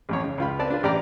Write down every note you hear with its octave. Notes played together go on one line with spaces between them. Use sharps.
A1 F2 C#5
C#3
C#2 F4 B5
C4 B4 D5 A5
D4 F4 B4
A1 G4 D5 A#5